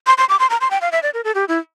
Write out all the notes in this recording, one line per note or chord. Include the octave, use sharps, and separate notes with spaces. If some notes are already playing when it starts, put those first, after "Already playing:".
C6
C6
D6
C6
A#5
C6
G5
F5
E5
D5
A#4
A4
G4
E4